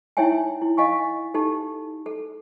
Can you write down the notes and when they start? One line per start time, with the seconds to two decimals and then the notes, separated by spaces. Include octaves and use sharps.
0.17 D#4 E4 C#5 E5 G5 G#5
0.62 E4
0.77 D#5 F5 G#5 C#6
1.34 D#4 G4 A4
2.06 A4